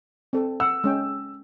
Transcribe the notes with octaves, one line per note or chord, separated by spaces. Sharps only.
C4 A4
F#5 E6
G#3 C#4 G5